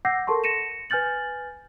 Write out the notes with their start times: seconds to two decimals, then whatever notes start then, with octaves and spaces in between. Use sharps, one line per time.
0.05 F#5 D6 E6 G6 A#6 C7
0.27 A4 A#4 A5 C6 C#6
0.44 A#6 C#7 D#7 E7
0.90 B4 G#5 F6 G6 A6 F#7